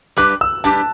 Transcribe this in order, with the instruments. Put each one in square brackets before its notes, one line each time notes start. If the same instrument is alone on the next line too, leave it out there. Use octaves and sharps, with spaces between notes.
[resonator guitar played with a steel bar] G3 D4 G4 B4 [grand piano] F#6
[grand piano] E6
[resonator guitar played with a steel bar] G3 D4 G4 B4 [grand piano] A5